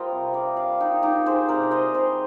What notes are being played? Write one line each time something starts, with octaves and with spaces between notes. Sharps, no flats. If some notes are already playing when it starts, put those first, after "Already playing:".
Already playing: G3 F4 A#4 C5 D#5 G5
C3
D5 F5
G3 D5 F5
D#4 G4
D#3 D#4 G4
G#4 C5
C3 A#4 D5
C5 D#5
G3 G#4 C5